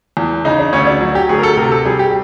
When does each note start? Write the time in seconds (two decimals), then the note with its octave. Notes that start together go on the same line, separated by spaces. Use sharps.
0.17 E2
0.45 C#3 D#4
0.59 D4
0.73 D2 C#4
0.87 D4
1.01 F#3
1.15 G4
1.29 D2 G#4
1.39 A#4
1.43 A4
1.57 C3 A#4
1.72 A4
1.85 G3 G#4
1.99 G4